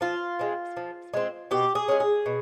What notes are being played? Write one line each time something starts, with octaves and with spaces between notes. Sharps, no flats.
F3 F4
G#3 C4
F3
G#3 C4
B2 G4
G#4
G#3 C#4
G#4
B2